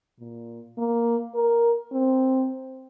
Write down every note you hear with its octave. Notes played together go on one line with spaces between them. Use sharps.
A#2
A#3
A#4
C4